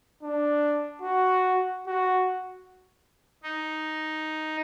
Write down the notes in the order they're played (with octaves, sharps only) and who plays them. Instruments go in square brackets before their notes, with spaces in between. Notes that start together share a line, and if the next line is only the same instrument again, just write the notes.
[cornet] D4
F#4
F#4
[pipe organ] D#4